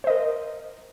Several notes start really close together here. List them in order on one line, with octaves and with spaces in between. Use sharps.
C5 D#5 A#4